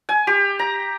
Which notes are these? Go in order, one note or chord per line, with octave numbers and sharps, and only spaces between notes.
G#5
G4
A#5